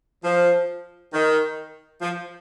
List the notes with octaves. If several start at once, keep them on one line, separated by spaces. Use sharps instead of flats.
F3
D#3
F3